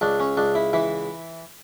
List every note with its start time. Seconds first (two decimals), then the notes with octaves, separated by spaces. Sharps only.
0.01 C#2 D4
0.20 C#4
0.37 C#2 D4
0.55 E4
0.73 E3 E4